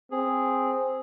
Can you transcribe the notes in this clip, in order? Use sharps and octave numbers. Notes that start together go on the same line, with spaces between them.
C4 G#4